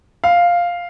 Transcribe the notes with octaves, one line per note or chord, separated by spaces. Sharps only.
F5